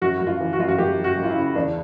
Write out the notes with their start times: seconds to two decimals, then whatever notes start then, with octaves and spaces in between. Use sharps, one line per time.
0.02 F#2 F#4
0.18 F#2 F#4
0.27 F4
0.40 E3
0.53 F#4
0.59 F#2 F4
0.68 F#4
0.78 F#2 G4
0.98 F#2
1.04 F#4
1.17 F#2
1.23 F4
1.30 E4
1.36 C#3
1.55 E2 D4